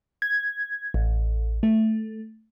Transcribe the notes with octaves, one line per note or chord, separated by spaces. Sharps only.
G#6
A1
A3